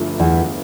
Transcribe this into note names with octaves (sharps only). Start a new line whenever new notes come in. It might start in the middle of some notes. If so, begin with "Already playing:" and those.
Already playing: G1 G2 D3 F3 A3
E2 E3